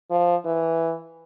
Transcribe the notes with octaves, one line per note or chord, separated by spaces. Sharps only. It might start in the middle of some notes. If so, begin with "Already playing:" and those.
F3
E3